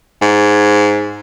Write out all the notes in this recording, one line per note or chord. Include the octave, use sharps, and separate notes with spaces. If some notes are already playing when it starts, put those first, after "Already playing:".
G#2